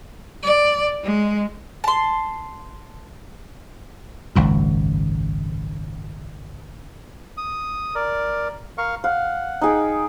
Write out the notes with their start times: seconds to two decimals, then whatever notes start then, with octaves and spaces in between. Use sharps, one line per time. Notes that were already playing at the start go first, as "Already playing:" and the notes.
0.43 D5
1.04 G#3
1.84 A5 C6
4.35 G#1 C#2 F#2
7.37 D#6
7.95 A#4 D5
8.78 A#4 F5 C#6
9.04 F5 F#5
9.62 D#4 G#4 G5